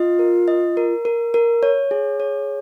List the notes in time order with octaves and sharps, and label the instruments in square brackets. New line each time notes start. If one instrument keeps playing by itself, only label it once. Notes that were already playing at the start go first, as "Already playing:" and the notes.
Already playing: [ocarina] F4 [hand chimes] D#5
[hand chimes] A#4
D#5
A#4
A#4
A#4
C#5
G#4
C#5